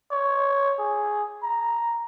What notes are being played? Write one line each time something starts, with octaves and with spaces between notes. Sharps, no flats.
C#5
G#4
A#5